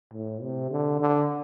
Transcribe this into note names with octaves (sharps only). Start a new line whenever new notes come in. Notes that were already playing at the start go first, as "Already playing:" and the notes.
A2
C3
D3
D3